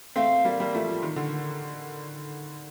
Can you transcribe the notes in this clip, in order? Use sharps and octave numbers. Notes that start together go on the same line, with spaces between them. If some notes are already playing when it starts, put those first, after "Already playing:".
A3 C4 F5
G3 A#3
G3 A#3
F3 A3
F3
D#3
D3